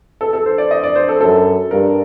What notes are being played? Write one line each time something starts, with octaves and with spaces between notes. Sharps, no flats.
A4
A4
C5
D5
D#5
D5
C5
A4
F#2 A4
G2 A#4